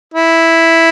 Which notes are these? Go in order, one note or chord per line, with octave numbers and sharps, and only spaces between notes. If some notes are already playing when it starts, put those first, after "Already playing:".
E4